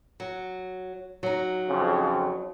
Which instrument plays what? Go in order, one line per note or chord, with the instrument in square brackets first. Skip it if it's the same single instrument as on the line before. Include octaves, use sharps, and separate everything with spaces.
[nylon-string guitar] F#3
F#3 D#4
[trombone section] F2 C#3